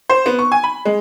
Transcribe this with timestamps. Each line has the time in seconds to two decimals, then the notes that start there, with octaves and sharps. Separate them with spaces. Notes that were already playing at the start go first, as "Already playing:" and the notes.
0.10 C5
0.26 B3
0.39 C#6
0.52 G#5
0.64 B5
0.85 G#3